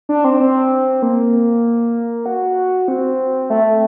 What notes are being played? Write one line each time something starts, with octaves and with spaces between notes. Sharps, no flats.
D4
C4
C4
A#3
F#4
C4
A3